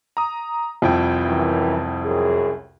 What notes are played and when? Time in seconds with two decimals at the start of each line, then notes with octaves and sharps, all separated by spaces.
0.17 A#5 D#6
0.82 C2 F2 E4 G5
1.25 F#2 E3
2.05 F#2 G#4